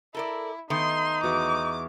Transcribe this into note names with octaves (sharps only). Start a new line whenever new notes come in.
E4 A4 A#4 D5
D#3 A3 B3 D#4 C6
E2 F#4 D6 D#6